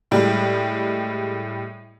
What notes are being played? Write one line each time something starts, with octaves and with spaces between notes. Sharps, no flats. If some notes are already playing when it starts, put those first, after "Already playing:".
A2 G3 G#3